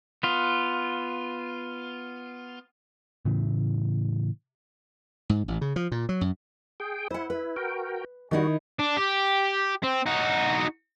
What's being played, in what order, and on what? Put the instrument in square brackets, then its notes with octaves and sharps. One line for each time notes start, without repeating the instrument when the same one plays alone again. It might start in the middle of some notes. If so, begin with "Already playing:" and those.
[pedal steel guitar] B3 F4
[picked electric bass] A2 C#3 E3
[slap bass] G#2
A1
C#3
F3
A#2
F#3
F#2
[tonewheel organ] G#4 G5
[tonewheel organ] E4 [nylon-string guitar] C5 F#5
[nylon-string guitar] B4
[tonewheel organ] F#4 A#4 G5
[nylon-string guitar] D#3 D#4 E4 [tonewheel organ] G3 F#4
[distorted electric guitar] D4
G4
C4
D#4 F#4